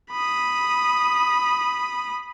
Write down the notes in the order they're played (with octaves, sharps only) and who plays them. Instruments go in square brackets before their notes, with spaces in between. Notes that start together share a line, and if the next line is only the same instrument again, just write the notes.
[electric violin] B5 D#6